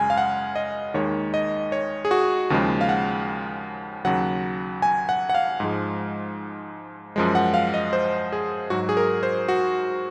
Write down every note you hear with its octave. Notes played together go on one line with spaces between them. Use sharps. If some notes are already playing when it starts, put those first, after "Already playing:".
Already playing: F#2 C#3 G#3 G#5
F5
F#5
D#5
D#2 D#3 G#3 C#5
D#5
C#5
G#4
F#4
D#2 C#3 F3 G#3
F5
F#5
D#2 C#3 F#3 F#5
G#5
F#5
F#5
F5
G#2 F3 G#3
F#2 F3 G#3
F#5
F5
D#5
C5
G#4
G#2 F#3 F#4
G#4
A#4
C5
F#4